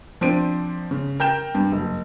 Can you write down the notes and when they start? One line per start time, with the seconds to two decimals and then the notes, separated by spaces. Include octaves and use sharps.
0.21 F3 C4 D4 C5 D7 D#7
0.91 C#3
1.20 A#4 G5 G6 E7
1.55 G2
1.72 F#1